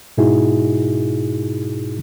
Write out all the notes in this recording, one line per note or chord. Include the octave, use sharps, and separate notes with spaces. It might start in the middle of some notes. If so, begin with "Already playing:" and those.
G#2 B2 D#4 E4 F#4 G#4